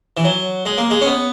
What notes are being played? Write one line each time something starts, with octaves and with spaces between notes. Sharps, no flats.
E3
F#3
G#3
A#3
G#3
C#4
B3